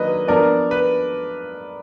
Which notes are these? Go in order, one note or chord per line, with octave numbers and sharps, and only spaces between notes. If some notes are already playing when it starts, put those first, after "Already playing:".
Already playing: D#3 F#3 A#3 D4 B4 D#5
F3 B3 D4 A#4 D5
B4